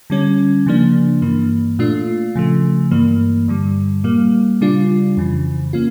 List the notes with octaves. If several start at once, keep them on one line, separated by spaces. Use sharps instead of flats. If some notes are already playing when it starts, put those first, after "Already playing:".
D3 G3 C#4
C#3 F3 A#3 D4
G2 E3 A#3
A#2 A3 D4 F4
C#3 F3 A3
G2 E3 A#3
G2 D3 G3
A#2 G3 A#3
C#3 G3 D4 F4
F2 C#3 E3
A#3 C#4 F4